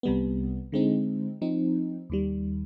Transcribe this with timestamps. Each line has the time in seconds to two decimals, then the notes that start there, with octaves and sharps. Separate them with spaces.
0.03 C2 C3 G3 B3
0.72 D3 G#3 C4 D#4
1.42 F3 C4 D#4
2.10 D#2 D#3 G3